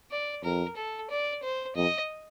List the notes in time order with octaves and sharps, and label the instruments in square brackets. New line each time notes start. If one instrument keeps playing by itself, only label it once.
[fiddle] D5
[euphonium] F2 [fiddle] A#4
[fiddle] A4
D5
C5
[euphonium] F2 [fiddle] D#5